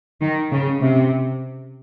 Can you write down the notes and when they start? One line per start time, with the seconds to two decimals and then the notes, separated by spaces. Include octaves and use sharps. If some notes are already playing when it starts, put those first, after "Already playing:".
0.21 D#3
0.52 C#3
0.82 C3